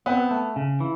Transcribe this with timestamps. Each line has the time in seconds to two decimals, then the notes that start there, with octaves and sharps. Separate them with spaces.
0.06 B3 C4
0.31 A3
0.56 C#3
0.80 E3